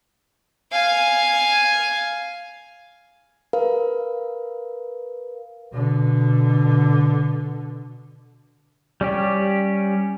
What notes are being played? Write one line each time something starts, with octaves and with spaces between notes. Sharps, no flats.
F5 G#5
A#4 B4 F5
B2 D3
G3 C#4 G4